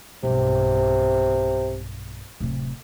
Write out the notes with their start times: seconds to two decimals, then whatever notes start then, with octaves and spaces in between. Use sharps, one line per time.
0.23 B1 G2 C3
2.40 D1 C3